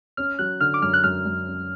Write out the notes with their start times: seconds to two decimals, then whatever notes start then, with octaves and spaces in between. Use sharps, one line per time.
0.17 C#4 F6
0.39 F#3 F#6
0.60 D3 F6
0.74 D6
0.82 F#2 F6
0.94 F#6
1.04 F#2 F6
1.26 F#2
1.47 C#4